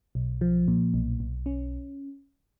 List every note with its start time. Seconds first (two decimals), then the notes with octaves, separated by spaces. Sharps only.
0.15 B1
0.41 F3
0.68 A#2
0.94 B1
1.20 B1
1.46 C#4